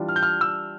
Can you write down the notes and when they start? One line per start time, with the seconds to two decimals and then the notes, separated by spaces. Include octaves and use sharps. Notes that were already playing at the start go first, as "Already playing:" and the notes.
Already playing: E3 G3 D4 F4
0.09 F6
0.16 G6
0.23 F6
0.41 E6